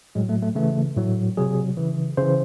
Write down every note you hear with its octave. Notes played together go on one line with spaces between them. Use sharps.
A2 F#3 G#3
A3
A3
C#3 E3 A3
A2 F#3
C3 F#3 G#4
C#3 E3
C#3 E3 C5